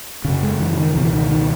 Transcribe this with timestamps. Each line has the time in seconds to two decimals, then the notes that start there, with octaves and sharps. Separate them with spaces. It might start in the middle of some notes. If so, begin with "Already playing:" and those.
0.25 F#2 C#3
0.43 G#3
0.59 E3
0.78 D#3
0.94 C#2 B2 E3
1.13 D#3
1.31 D#3